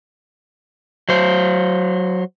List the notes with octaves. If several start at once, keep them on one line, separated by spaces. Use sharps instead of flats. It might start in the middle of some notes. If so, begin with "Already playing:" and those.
F#3 C5